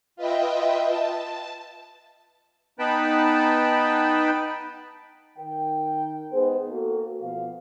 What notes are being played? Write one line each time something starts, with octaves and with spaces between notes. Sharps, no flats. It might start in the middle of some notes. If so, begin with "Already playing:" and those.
F4 B4 D#5 E5 G5
A5
B3 D#4 B4 G5 A5 B5
D#3 A#4 G5
G#3 B3 D#4 G#4 C5
A#3 F#4 A4
B2 F3 B3 F5